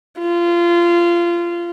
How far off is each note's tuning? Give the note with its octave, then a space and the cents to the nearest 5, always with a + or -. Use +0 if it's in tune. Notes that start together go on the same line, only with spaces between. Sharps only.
F4 -20